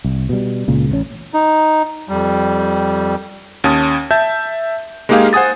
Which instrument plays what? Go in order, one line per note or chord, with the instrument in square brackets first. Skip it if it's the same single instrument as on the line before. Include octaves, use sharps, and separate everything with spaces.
[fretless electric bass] C2
B2 G3
C#2 A#2 C#3
A1 C#4
[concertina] D#4
[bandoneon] F2 G3
[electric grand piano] D#2 C#4 G#5 A5 D#6
E5 A5 G6
G#3 A#3 D#4 G4 G#4 F5
C5 F#5 G#5 D#6 A6